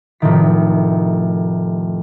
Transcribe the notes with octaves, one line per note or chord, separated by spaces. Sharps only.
F1 A2 D#3 B6